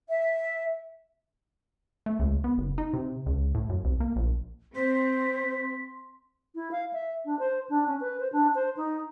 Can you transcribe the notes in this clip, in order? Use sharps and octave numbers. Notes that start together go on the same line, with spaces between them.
E5
A3
C#2
B3
F#1
D#4
C3
C#2
A2
F#2
C2
A#3
A#1
C4 C5 C6 B6
E4
F5
E5
D4
C5
D4
C#4
B4
C5
D4
C5
D#4